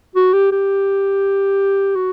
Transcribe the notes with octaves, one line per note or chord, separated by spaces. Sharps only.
F#4
G4
G4
F#4